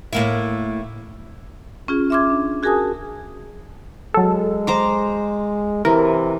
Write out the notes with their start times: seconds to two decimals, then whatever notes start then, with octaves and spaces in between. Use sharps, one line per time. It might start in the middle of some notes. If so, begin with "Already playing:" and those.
0.13 A2 A#3 E4
1.88 C#4 F4 G#4
2.10 E5 C6 D6 F6 G#6
2.30 D4
2.63 F#4 G#4 A#4 G#5 A5 D#6
4.14 F#3 G#3 A4
4.67 C5 A#5 D6
5.85 C3 E3 A#4